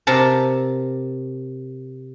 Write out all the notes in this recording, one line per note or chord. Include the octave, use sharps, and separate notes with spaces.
C3 A#4 A5